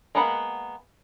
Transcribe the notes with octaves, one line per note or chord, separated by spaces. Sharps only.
G#3 A#3 B3 F#5 B5